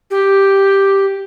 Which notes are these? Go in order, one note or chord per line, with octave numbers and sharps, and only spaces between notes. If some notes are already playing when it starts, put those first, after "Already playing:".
G4